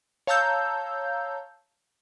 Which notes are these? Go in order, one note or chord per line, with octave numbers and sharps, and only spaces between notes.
C#5 F5 A5 A#5 E6 G6